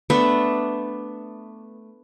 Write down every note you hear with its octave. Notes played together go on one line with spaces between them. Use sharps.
A3 B3 D4 E5